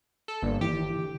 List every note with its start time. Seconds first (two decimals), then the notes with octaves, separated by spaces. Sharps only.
0.28 A4
0.42 G1 A#3 D5
0.61 D#3 E3 E4 G4
0.96 D3